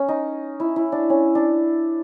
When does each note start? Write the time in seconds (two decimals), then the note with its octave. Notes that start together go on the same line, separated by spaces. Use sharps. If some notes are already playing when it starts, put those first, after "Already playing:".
Already playing: C#4
0.08 D#4
0.60 E4
0.76 E4
0.92 D4
1.10 C#4
1.35 D4